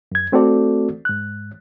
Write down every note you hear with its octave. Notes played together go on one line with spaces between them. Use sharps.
F#2 G#6
A3 C4 F#4 A4 D5
G#2 F#6